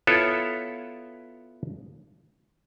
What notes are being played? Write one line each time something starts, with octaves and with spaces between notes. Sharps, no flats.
B3 E4 F4 A4 C#5